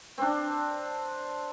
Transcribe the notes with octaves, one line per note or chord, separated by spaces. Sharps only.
C4 D4